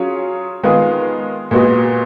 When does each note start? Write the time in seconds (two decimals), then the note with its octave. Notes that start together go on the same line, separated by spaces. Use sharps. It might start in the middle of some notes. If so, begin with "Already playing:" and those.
Already playing: F#3 C#4 F4 G#4 C#5
0.63 D#3 G#3 B3 F4 G#4
1.51 A#2 G#3 B3 F#4